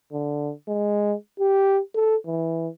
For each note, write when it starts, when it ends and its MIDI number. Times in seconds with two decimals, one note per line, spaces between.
0.12 0.52 50
0.68 1.14 56
1.39 1.80 67
1.95 2.16 69
2.26 2.68 52